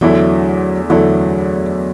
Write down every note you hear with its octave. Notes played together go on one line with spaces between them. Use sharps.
E2 D3 F#3 A3 E4
E2 D3 F#3 A3 E4